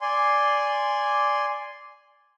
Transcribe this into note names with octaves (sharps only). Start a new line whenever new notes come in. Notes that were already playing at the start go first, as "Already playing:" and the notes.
D5 G#5 C6